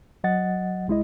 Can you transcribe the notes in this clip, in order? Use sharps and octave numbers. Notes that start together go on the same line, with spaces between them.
F#3 D#5 F#5 A6
C2 G#3 E4 D#5